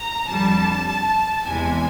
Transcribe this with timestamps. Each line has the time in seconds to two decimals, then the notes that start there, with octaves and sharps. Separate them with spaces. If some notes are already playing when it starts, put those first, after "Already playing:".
Already playing: A#5
0.27 F2 D3 G3 A5
0.87 A5
1.45 E2 C3 E3 G#3 G#5